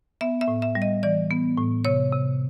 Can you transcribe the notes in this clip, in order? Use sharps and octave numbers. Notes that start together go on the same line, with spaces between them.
B3 E5
E5
A2
E5
G3
D#5
E3 D5
B3
A2
C3 C#5
C3